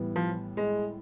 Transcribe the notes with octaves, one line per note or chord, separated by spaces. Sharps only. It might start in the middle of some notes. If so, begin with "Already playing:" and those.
Already playing: A2 E3 G3 B3
F3
G#3